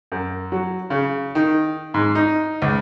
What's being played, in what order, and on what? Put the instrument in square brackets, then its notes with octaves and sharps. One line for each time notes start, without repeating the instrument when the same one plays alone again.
[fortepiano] F#2
F#3
C#3
D#3
G#2
D#4
C#2